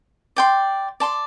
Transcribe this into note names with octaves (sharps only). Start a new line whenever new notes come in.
D5 G5 C6
D5 A5 C6